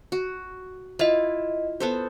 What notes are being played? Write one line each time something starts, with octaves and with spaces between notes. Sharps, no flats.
F#4
E4 F4 D#5 E5
B3 A4 C5